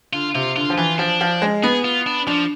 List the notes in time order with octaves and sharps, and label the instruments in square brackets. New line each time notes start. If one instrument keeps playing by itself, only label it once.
[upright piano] D3 [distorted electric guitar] F4
[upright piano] C3 [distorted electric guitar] F4
[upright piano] D3 [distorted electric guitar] F4
[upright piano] F3
[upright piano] E3 [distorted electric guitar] F4
[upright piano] F3 [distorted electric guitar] D4
[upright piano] F3
G#3
[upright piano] B3 [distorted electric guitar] G#4
[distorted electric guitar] F4
D4
[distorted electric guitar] F3 [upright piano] D4